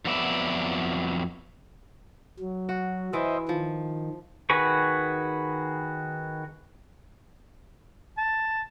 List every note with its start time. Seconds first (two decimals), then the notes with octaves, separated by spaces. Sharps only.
0.05 F2 F#3 B3 D5 E5
2.39 F#3
2.69 F#4
3.13 E3 C5 D#5 E5
3.49 D#3 F3
4.50 D#3 F#4 G#4 B4 C#6
8.18 A5